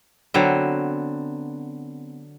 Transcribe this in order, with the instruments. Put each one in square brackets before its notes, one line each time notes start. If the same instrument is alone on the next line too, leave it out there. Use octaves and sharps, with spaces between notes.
[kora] D3 F#3 B3 C4